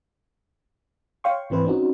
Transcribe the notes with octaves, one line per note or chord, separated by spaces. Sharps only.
C#5 F5 G5 C6 C#6
G#1 E3 C4 B4 C5
C4 C#4 D#4 F#4